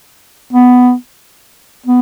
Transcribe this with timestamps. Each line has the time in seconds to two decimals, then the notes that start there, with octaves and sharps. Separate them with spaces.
0.53 B3
1.86 B3